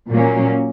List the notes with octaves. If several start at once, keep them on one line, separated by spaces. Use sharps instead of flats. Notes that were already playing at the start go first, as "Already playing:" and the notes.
A#2 F#3 A#3 C#4